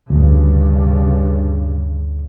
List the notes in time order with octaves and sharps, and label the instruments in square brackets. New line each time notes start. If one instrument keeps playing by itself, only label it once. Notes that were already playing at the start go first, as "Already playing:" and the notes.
[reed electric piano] D2 [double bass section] G2 C#3